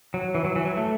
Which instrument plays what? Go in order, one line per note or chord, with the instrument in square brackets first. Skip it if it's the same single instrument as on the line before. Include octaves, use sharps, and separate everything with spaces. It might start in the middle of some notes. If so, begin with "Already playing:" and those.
[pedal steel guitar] F#3
E3
F#3
E3
F#3
A3